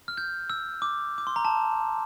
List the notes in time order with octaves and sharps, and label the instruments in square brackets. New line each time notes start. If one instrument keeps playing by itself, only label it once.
[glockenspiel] F6
G6
E6
D6
D6
C6
A#5
A5